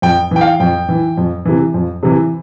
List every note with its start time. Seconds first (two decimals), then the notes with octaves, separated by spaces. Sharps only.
0.02 F2 G5
0.31 E3 G5
0.41 F5
0.60 F2 G5
0.89 E3
1.17 F2
1.46 C3 E3
1.74 F2
2.03 C3 E3